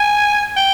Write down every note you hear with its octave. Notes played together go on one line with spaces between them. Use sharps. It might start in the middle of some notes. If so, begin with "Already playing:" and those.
Already playing: G#5
G5